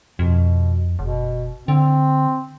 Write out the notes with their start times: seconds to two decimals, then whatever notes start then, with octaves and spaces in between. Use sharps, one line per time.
0.19 F2 B2
0.99 F#1 B2
1.68 D3 C4